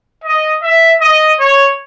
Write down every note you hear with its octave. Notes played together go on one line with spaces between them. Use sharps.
D#5
E5
D#5
C#5